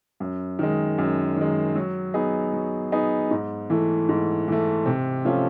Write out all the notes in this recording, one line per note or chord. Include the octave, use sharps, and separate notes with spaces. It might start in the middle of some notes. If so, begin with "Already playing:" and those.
F#2
D#3 G#3
F#2
D#3 G#3
F#3
B3 D#4 G#4
F#3
B3 D#4 G#4
G#2
E3 A3
G#2
E3 A3
C3
F3 A3 C#4 F4